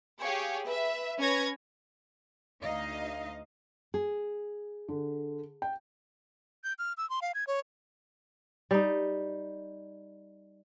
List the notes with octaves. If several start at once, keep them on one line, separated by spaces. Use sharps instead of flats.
G4 G#4 C#5 F5 G5 G#5
B4 E5
C#4 B4 C#5 G#6 A#6
D2 D#4 D#5 F5
G#4
D3
G5
G6
F6
E6
C6
F5
G#6
C#5
G3 D#4